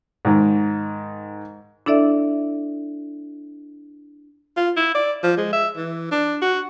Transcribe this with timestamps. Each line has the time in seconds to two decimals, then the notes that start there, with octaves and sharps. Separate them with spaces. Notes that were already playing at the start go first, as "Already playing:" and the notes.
0.25 G#2 D#3
1.86 D4 E4 A4 D5 E5
4.57 F4
4.76 E4
4.95 D5
5.23 F3
5.37 G#3
5.53 E5
5.77 E3
6.11 D4
6.42 F#4